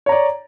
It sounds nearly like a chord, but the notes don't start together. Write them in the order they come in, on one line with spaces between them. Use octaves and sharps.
C#5 A#5 D5